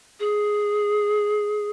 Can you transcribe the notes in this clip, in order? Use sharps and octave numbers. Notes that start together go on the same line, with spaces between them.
G#4